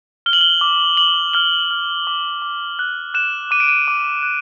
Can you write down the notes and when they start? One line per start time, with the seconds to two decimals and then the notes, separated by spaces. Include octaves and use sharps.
0.26 F6 G7
0.33 F#7
0.41 G7
0.61 D6
0.97 D6 F#7
1.34 F6 G7
1.71 F6
2.07 D6
2.42 D6
2.79 F#6
3.14 F#6 E7
3.51 D6 D#7
3.60 D7
3.68 D#7
3.88 D6
4.23 F#6